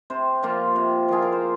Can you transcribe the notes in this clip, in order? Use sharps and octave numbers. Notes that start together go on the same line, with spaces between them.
C3 C5
F3 A#3 F4
C3
F3 A#3 F4 G#4
A#4
C5